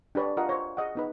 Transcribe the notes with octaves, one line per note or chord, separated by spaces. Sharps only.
D4 G4 B4 C#5 D5
F4 A#4 D#5 F#5
C5 C#5
G#4 D#5 F#5
B3 D#4 B4